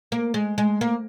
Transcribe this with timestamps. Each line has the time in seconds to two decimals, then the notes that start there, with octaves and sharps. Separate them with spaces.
0.12 A#3
0.34 G#3
0.58 G#3
0.81 A#3